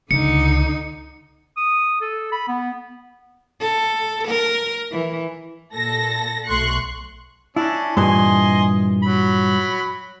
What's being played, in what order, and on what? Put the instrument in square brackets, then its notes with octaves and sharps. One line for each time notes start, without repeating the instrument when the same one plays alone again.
[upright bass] C#2 [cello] D3 D#4 [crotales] C#7
[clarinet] D#6
A4
B5
B3
[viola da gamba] A4
A#4
E3
[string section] A#2 A4 A#6
B1 A3 C6 C#6 F#6 C#7
[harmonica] C#4 D4 [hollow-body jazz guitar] E4
[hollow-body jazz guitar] G2 A#2 E3 [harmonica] D#5 G#5 C6
[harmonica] F#3 B5